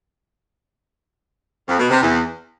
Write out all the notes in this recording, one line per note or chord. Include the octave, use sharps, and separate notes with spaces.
F2
B2
C3
E2